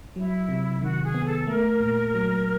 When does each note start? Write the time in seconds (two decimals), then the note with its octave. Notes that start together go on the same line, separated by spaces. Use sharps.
0.15 F#3 E4
0.49 C3
0.82 D#3 F#4
1.04 G#4
1.15 B3
1.26 A4
1.47 A3 A#4
1.80 A#2
2.15 F#3